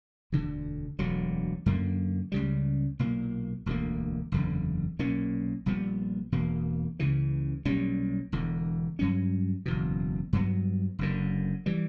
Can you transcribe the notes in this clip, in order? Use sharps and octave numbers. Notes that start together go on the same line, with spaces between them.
E1 D2 D3
E1 D2 D3 F#3
F#2 D3 A#3
C#2 C#3 G3
B1 A#2 A#3
E1 D2 D3 A#3
F#1 E2 D3
B1 A#2 A#3 C#4
A#1 A#2 G3 B3
E1 E2 B2 A#3
C#2 C#3 E3
B1 A#2 G3 C#4
E1 E2 D3
G2 F#3 C#4
F#1 E2 B2
G2 F#3 B3
F#1 F#2 D3
E3 G3